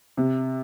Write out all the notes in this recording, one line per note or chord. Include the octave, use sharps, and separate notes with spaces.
C3